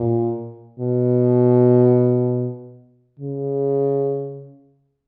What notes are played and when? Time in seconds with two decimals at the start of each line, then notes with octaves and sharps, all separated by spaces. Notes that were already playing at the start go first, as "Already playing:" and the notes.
Already playing: A#2
0.79 B2
3.20 C#3